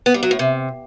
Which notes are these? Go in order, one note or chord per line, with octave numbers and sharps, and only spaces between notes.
B3
G3
F#3
A2
C3